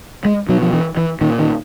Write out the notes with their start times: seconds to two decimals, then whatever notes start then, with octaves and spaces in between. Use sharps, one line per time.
0.25 G#3
0.49 B2 F#3
0.62 F3
0.73 E3
0.97 E3
1.21 A#2 D#3
1.39 D#3